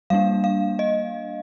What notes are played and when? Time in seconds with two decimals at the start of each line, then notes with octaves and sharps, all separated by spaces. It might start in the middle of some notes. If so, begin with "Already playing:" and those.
0.10 G3 A#3 D4 F5
0.44 F5
0.79 D#5